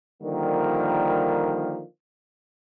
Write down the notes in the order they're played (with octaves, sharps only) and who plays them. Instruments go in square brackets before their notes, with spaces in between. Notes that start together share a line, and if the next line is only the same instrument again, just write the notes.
[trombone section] D3 D#3 F3 G3 A#3